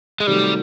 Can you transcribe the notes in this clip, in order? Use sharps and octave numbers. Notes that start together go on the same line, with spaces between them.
G#3
C3 D#3 F#3 G3 A3